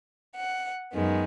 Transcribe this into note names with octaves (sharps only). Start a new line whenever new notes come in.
F#5
F#2 D#3 G#3 B3